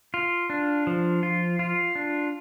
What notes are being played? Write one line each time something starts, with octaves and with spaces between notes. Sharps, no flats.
F4
D4
F3
F4
F4
D4